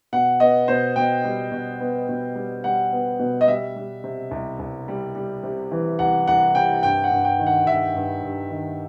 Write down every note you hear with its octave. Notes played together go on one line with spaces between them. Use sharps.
B2 F#5
B3 D#5
B2 C5
B2 G5
G3
B2
B3
B2
G3
G3 F#5
B3
B2
D#5
G3 E5
G3
C3
C2
C2
G3
G3
C3
E3
C2 F#5
C2 F#5
C3 G5
G2 G5
F#5
G2
G5
D#3
F#5
G2 E5
G2
G2
D#3